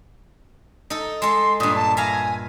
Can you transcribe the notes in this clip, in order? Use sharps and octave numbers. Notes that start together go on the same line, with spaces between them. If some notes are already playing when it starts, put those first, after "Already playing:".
D#4 A4
G#3 A4 C6
G2 A#2 D#6
A5
E5 F5 G#5 A#5